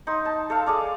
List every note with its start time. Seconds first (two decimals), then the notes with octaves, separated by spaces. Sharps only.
0.07 D#4 C6
0.25 A5
0.50 A4 E5 F5
0.66 G#4 D5 F5